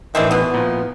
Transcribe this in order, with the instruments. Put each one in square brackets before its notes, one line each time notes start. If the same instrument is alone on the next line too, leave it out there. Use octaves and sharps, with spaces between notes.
[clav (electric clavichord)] A1 D4 E5 [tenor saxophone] D#3 [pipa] E3 G3 C4
[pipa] B2 E3 [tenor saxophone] B3
[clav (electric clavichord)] A#2 F3